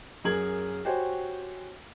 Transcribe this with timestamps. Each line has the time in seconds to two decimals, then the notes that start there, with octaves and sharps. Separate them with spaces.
0.24 F#2 G#4 A#4 G#6 F#7
0.85 F#4 G4 C5 C#5 G#5